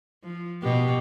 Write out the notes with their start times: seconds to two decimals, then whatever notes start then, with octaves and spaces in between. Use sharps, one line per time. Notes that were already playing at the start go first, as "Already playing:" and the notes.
0.24 F3
0.63 B2 G4